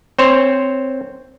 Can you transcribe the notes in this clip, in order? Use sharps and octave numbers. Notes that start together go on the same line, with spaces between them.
C4 C5 C#5